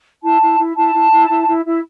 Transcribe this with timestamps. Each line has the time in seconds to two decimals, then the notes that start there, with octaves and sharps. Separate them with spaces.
0.22 E4 A5
0.41 E4
0.58 E4
0.76 E4 A5
0.93 E4
1.11 E4
1.29 E4
1.46 E4
1.64 E4